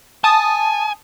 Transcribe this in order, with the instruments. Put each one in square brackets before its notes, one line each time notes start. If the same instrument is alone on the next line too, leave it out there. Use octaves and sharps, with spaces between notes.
[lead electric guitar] G#5 [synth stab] A5 D#6